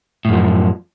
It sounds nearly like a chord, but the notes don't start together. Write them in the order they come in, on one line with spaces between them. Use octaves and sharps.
A2 F#2 F3